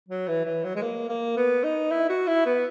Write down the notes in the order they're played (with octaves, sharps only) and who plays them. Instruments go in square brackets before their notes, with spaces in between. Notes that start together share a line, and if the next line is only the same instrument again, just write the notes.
[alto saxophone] F#3
E3
E3
F#3
G#3
A#3
A#3
B3
D#4
E4
F#4
E4
B3